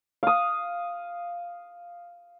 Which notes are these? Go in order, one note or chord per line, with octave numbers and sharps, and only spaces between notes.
F5 D#6